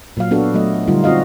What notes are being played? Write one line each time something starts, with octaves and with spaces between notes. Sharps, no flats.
A#2 F#3 F5
B3 D4 F#4 A4
F#3 A3 D#5
D3 G3 D#4 F4
C4 F4 F#4 D#5 F5